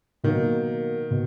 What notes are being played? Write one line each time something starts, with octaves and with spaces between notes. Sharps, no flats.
B2 D#3 F#3 A#3
B2